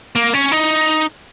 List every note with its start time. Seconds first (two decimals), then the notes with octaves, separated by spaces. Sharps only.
0.16 A#3
0.34 C#4
0.52 D#4